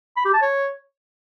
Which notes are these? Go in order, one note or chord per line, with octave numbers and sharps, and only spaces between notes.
B5
G4
A5
C#5